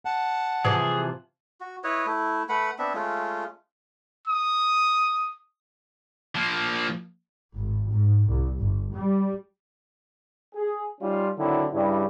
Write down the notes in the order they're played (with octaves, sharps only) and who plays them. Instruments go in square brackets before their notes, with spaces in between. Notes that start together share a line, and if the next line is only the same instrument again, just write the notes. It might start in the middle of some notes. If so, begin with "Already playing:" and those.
[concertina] F#5 A5
[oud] C3 E3 F3 [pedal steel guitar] G#4
[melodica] F#4
E4 B4 C#5 D#5
A3 E4
A3 B4 F#5 B5
B3 C4 D4 E5
G#3 A3 C#4 F4
[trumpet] D#6
[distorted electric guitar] F3 A#3
[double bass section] G#1
G#2
C2
G1
G3
[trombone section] G#4
G3 C#4 D#4 F4
D3 D#3 F#3 C4 E4
G2 C#3 G3 C#4 E4